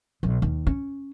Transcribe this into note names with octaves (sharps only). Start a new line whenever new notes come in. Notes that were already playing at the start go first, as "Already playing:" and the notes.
B1
D#2
C#4